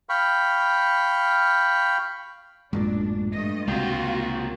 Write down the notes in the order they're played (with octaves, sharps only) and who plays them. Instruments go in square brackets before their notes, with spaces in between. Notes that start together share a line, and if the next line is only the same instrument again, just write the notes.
[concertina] F5 G5 B5 C#6
[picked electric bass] A1 F#2 A#2 [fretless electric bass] G#3 [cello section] D4
[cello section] G2 A3 D#5
[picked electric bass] C#2 C3 [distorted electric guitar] A#3 G5 [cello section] F4 F#4